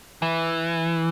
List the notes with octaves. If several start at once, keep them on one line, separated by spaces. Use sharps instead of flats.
E3